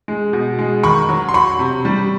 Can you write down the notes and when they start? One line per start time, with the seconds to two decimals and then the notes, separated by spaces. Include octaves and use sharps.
0.08 G#3
0.33 B2
0.59 G#3
0.83 D#3 B5 C#6
1.09 F#3
1.29 C6
1.34 F#3 B5 C#6
1.59 C3
1.85 G3